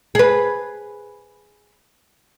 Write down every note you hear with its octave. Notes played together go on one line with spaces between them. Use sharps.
G#4 B4